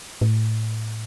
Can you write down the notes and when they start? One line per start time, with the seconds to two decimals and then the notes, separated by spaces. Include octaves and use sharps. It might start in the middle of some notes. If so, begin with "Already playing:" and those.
0.21 A2